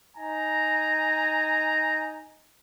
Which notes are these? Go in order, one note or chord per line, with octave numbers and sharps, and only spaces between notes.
D#4 G#5 A#5